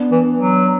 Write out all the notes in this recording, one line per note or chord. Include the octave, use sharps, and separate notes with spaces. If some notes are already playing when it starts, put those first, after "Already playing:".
Already playing: B3 D4
E3
F#3